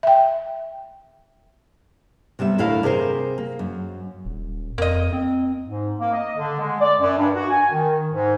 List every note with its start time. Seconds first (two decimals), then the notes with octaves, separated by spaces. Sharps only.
0.03 E5 G5
2.39 C3 G3 B3 E5
2.58 D2 A2 E4 A#4 D#5 F5
2.83 C3 G#4 A#4 C5
3.38 A#3
3.59 F#2
4.25 D#1
4.78 F2 A#3 D#5
5.13 C4
5.66 G#2
6.00 A#3
6.13 D#5
6.37 D3
6.60 G#3
6.81 D5
6.99 F#2
7.18 G2
7.35 F#4
7.49 G#5
7.71 D#3
8.11 G#2